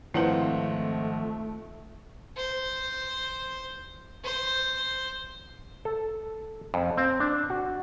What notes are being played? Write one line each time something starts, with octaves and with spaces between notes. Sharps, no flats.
G#1 D#3 F3 A3 C4 E4 B4 F#5
C5
C5
A4
F2
C4
D4
F#4